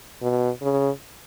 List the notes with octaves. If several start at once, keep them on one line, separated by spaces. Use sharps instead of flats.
B2
C#3